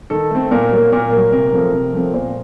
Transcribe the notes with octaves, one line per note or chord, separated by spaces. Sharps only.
D#3 A4
A3 C4
A#2 A#4
F#3 A#3
A#2 A#4
F#3 A#3
C3 A#4
F3 A3 C4
C3
F3 A3 C4
A#2 C5